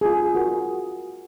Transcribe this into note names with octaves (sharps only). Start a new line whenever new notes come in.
F4 G#4
F#4 A#4